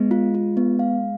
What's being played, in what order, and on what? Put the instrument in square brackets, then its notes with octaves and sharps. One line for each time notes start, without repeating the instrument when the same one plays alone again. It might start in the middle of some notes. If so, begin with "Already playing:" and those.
Already playing: [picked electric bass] G#3 [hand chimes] B3
[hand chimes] F4
F4
B3
F5